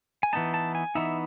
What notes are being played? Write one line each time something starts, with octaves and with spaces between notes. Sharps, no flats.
G#5
E3 B3 D#4 A5
A5
G#5
E3 B3 D#4 E5